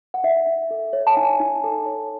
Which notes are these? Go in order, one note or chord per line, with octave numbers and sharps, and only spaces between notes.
F#5
D#4 E5
D#4
A4
C#5
A5
D#4 G#5
D#4
A4
C#5